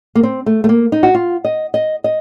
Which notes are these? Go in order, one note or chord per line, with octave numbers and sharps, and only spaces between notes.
A#3
C4
A3
A3
A#3
D#4
F#4
F4
D#5
D#5
D#5